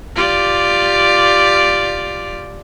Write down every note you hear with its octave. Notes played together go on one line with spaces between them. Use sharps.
F4 G4 D5